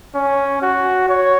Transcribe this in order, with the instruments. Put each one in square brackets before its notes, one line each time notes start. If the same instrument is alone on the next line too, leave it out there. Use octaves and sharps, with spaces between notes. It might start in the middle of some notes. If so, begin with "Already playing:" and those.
[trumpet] C#4
F#4
C#5